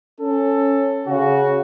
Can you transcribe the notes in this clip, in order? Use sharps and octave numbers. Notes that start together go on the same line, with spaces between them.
C#4 A4
C#3 F#4